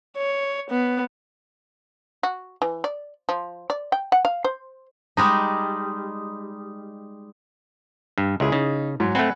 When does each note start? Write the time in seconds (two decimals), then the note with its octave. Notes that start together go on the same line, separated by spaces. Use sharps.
0.17 C#5
0.70 B3
2.23 F#4
2.62 E3
2.84 D5
3.29 F3
3.70 D5
3.92 G5
4.12 F#5
4.25 F5
4.44 C5
5.17 G3 G#3 D#4
8.18 G2
8.40 C#2 E4 G#4
8.52 C#3 D#4
9.00 G#2 F#3
9.15 A3 C4 B4 F#5 G#5